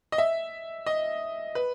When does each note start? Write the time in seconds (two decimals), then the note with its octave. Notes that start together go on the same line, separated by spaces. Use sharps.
0.12 D#5
0.18 E5
0.86 D#5
1.55 B4